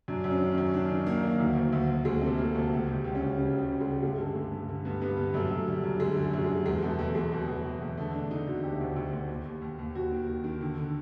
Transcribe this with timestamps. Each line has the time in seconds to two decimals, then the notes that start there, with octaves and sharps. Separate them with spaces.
0.08 F#2 D4
0.24 F#2
0.30 C#4
0.41 D#3
0.52 C#4
0.58 F#2
0.74 D#3 D4
0.90 D#3 D#4
1.06 D#3 A#3
1.23 D#3 A#3
1.40 D2
1.55 D2
1.72 D2
1.89 D2
2.05 D2 G#3
2.21 C3 A3
2.38 C3 A#3
2.54 D2 A3
2.71 C#2
2.87 C#2
2.93 G3
3.04 C#2
3.15 C#4
3.20 C#2
3.37 C#3 G3
3.53 C#2
3.59 G3
3.70 C#3
3.81 G#3
3.87 C#2
4.02 G2 G#3
4.12 A3
4.19 D3 G#3
4.35 G2 A3
4.52 G2
4.69 D3
4.85 G2 B3
5.02 G2 B3
5.17 D3 B3
5.34 F#2 A3
5.51 F#2
5.67 D3 G3
5.84 F#2
6.00 D3 G#3
6.17 D3
6.22 G3
6.33 F#2
6.44 G#3
6.50 D3
6.66 E2 G#3
6.82 B2 A3
6.99 E2
7.15 E2 G#3
7.32 B2
7.48 E2
7.65 E2
7.82 E2
7.98 D3 A3
8.14 D3 D4
8.31 D3 D#4
8.47 D3 F#4
8.63 D2 G4
8.80 D2
8.96 D2
9.13 D2
9.29 D#2
9.45 D#2
9.62 D#2
9.79 D#2
9.95 D#2 F#4
10.11 D#3
10.28 D#3
10.44 D#3
10.61 D3
10.78 D3